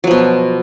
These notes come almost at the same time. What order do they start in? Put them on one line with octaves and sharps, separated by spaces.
F#3 F3 B2